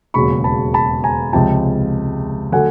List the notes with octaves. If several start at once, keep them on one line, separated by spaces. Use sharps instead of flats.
E1 D#2 C#3 F#3 A#3 B5 C#6
A5 B5
A5 B5
G#5 A#5
C#2 C3 F3 G5 A5
D3 F#3 A3 F#5 G#5